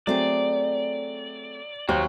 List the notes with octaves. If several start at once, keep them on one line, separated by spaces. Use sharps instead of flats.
F#3 A3 C4 G#4 D5
D#2 F#3 C5